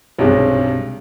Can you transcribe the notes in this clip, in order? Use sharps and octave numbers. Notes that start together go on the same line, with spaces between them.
B1 G2 C3 G#3